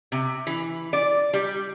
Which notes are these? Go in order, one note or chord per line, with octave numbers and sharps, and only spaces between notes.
C3
E3
D5
G3